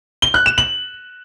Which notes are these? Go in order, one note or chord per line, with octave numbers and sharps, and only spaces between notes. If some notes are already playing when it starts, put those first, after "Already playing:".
G7
F#6
E7
F#7